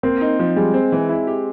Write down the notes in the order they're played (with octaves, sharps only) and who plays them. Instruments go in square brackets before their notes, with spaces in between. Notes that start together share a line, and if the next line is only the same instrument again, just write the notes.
[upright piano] A#3 [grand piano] C4
[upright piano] D#4
F3
[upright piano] G3 [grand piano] G#3
[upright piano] C4
E3
E4
G4